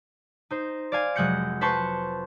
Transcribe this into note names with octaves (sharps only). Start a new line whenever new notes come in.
D#4 C5
D5 F5 G#5
F1 F#3 G#3 F#5 G6 C#7
B4 C5 A5 C6 C#6 G6